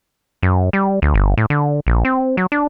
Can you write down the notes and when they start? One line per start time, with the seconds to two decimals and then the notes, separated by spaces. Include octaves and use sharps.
0.43 F#2
0.73 G3
1.02 D2
1.14 G1
1.38 A2
1.50 D3
1.87 A#1
2.05 C4
2.37 F#3
2.52 D4